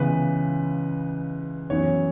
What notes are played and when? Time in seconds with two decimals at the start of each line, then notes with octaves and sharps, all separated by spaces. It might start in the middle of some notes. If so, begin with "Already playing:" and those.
Already playing: C#2 C#3 E3 B3 B4
1.70 F#2 E3 B3 C#5